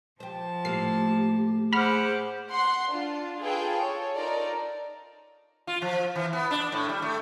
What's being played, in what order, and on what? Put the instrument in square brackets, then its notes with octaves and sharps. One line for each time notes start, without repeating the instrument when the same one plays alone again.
[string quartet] F3 A5 [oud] G4 C5
[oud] A2 A3 A#3 [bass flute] G4 [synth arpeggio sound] C7
[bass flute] G#4 [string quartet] C5 F#5 D6 [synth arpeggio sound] B5 F6
[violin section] F#5 C6
D4 F4
F4 G#4 A4 B4 G5
A4 C#5
D#4 F4 A4 A#4 D5
[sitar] F4
F3
E3
B3
D4
A2
G3
A3